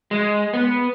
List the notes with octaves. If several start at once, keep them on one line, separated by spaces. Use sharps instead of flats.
G#3
B3